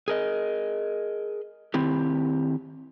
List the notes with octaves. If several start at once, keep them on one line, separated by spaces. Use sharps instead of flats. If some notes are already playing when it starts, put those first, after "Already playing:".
G#4 A#4 D#5
D#3 C4 E4 G4